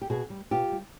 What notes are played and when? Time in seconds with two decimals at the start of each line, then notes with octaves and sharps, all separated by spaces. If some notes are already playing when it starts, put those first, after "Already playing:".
0.01 G4
0.10 B2 F#4 G#4
0.30 G3
0.51 B2 F4 G4
0.72 G3